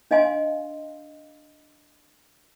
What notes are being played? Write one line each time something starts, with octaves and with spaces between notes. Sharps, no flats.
D4 D#5 F5 G#5 C6